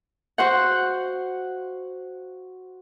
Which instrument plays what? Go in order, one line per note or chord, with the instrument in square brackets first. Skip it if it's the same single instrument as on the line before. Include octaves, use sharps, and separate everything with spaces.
[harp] F#4 C5 F#5